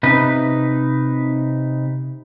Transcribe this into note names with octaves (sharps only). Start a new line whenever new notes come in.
C3 D#4 B4